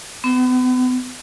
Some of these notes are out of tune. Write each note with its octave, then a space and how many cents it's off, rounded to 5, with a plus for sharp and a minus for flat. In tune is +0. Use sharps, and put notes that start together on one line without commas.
B3 +40